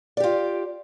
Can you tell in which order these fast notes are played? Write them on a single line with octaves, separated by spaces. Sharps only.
D5 G4 F4